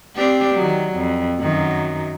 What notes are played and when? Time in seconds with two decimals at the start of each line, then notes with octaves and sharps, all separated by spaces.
0.16 C4 D4 G4
0.55 D#3 F#3
0.96 F2
1.40 F#2 D#3 F#3